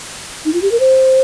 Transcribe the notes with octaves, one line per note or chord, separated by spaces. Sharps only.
D#4
F4
G4
A#4
C5